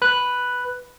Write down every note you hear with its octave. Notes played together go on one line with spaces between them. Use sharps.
B4 F#6